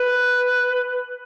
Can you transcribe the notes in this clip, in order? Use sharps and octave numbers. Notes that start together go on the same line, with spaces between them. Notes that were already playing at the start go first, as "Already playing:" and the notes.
Already playing: B4